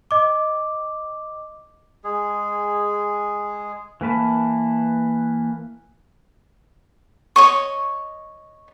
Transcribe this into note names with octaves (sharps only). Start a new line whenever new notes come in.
D#5 D6
G#3 G#4
E3 A#3 B4 A5
C#5 D#5 C#6